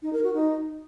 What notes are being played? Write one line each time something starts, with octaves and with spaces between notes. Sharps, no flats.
D#4
A#4
F#4
D#4